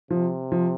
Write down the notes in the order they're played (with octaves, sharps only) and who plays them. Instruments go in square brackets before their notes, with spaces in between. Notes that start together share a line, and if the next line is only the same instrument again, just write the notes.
[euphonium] C3 [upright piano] F3
[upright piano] F3